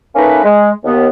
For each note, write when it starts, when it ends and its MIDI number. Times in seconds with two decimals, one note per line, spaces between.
0.16 0.41 57
0.16 0.41 58
0.16 0.41 61
0.16 0.41 63
0.16 0.41 71
0.44 0.70 56
0.84 1.09 39
0.84 1.09 59